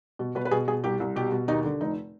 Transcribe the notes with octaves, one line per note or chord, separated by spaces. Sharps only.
B2
B2 B4
B4
B2 G#4
B2 G#4
C2 G4
C2
B2 G4
B2
D#2 D#4
D3
F1 D#4